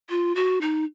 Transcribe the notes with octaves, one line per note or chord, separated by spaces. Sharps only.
F4
F#4
D#4